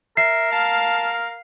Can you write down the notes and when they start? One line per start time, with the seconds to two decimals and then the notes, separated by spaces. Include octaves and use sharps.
0.17 A#4 E5 C7
0.52 F5 A5